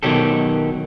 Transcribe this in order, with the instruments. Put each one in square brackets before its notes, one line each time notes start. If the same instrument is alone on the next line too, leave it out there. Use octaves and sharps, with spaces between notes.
[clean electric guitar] B2 D#3 F#3 G4 A4